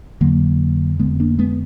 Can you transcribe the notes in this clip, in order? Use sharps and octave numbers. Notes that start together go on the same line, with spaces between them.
F2 D3 F#3 A#3
F2 D3 G#3 B3
A#3 D4
G#3 B3